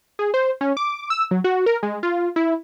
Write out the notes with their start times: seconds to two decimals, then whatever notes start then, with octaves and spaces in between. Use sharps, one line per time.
0.19 G#4
0.34 C5
0.61 C#4
0.77 D6
1.10 E6
1.31 F#3
1.44 F#4
1.66 A#4
1.83 G#3
2.03 F4
2.36 E4